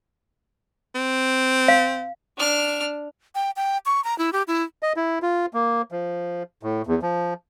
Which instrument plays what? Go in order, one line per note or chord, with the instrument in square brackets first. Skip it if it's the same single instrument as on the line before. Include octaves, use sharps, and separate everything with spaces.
[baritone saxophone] C4
[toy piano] F5
[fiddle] D4 F6
[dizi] G5
G5
C#6
A#5
E4
G4
E4
[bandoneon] D#5
E4
F4
A#3
F3
A2
E2
F3